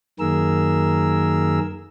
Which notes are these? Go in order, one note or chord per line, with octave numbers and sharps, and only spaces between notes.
F#2 D#3 A#3 G#4 A#4 E6